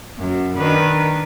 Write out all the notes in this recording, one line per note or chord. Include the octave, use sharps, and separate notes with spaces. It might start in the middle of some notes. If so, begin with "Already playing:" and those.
F#2
D#3 D4 B4